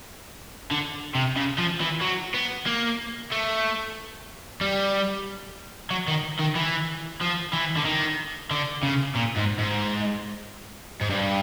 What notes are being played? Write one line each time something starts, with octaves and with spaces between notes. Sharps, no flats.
D3
C3
C#3
F3
E3
F#3
B3
A#3
A3
G3
F#3
D#3
D#3
E3
F3
E3
D3
D#3
D3
C#3
A#2
G#2
G#2
G#2
G2